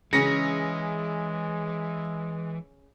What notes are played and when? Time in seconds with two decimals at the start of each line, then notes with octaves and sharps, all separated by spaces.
0.13 C#3 E3 G#3 C#4 A#6 C#7